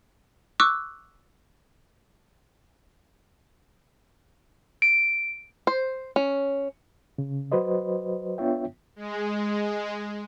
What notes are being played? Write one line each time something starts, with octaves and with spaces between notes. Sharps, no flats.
C#6 D6 E6 F#6
D7
C5
C#4
C#3
F#3 F#4 B4 C5 D#5
B3 D4 F4 C#5 E5 G5
G#3